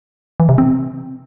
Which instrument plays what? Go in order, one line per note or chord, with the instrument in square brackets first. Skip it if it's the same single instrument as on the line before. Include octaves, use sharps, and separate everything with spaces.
[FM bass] E3
C3
C4